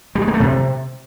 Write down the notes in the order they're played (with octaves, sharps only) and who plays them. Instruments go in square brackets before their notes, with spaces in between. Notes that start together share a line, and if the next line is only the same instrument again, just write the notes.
[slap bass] G3
G#3
A#3
A3
C3